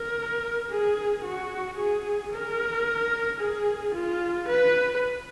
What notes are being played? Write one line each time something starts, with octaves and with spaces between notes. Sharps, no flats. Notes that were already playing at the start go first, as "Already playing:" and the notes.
Already playing: A#4
G#4
F#4
G#4
A#4
G#4
F4
B4